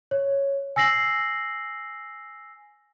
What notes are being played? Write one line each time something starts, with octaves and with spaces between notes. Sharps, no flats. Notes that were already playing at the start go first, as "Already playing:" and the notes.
C#5
G#5 E6 A#6 C7 F#7